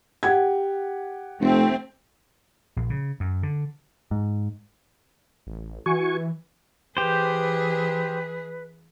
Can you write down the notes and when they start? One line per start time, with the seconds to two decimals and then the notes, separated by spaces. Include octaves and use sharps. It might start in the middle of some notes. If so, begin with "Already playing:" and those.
0.23 G4 F#5 G#6
1.41 F1 A3 C4
2.76 A#1
2.90 C#3
3.20 F#2
3.43 D3
4.11 G#2
5.47 A1
5.86 E3 F#4 G#5 C#6
6.97 E3 G4 G#4 B4 C5